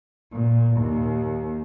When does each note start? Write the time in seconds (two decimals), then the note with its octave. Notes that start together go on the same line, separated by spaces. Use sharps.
0.31 A#2
0.76 D#2